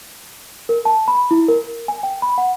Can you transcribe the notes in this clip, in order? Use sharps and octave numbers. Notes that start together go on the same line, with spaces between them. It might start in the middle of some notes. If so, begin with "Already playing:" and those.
A#4
A5
B5
E4
A#4
G#5
G5
B5
F#5